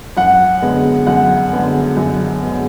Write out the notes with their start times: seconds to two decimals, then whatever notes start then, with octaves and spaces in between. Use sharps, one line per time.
0.17 F#2 F#5
0.62 D3 G#3 B3
1.07 F#2 F#5
1.53 D3 G#3 B3
1.97 F#2
2.42 D3 G#3 B3